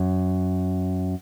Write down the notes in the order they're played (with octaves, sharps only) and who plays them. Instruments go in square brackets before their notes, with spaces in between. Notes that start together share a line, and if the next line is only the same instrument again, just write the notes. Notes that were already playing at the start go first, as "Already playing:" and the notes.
Already playing: [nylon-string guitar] F#2